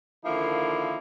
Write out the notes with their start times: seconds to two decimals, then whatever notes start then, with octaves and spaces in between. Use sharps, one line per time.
0.24 D3 D#3 F3 A#3 E4